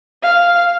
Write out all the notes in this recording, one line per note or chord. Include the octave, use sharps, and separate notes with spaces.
F5